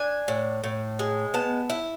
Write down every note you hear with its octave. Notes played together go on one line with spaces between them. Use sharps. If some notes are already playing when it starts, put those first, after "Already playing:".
Already playing: D4 G#5
A2
A2
G#3
B3 A5
E4